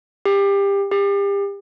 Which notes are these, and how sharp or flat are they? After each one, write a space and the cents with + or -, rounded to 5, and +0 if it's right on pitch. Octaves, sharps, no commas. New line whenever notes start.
G4 +25
G4 +35